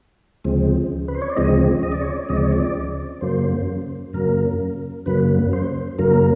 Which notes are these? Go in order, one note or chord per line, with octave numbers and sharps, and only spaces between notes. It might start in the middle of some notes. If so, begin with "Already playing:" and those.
D2 C#3 F3 G#3 C4
B4
C5
C#5
D5
D2 C#3 F3 G#3 C4 D#5
D#5
D5
C#5
D5
D2 C#3 F3 G#3 C4 D#5
D5
C#5
D5
F#2 C#3 F#3 A#3 C5
F#2 C#3 F#3 A#3 A#4
F#2 C#3 F#3 A#3 B4
C5
F#2 C#3 F#3 A#3 A#4